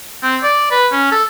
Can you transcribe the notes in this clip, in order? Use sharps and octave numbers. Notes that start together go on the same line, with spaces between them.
C4
D5
B4
C#4
A4